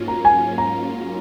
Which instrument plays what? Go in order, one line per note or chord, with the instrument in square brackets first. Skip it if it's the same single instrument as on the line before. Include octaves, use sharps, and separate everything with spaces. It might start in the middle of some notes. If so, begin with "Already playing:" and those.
Already playing: [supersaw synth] G#2 F#3 A#3 C#4 F4
[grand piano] A#5
G#5
A#5